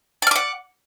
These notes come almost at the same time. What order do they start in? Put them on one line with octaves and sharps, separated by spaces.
D5 F6 D6 F#5